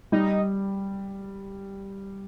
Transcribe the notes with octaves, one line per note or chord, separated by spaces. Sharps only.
G3 D#4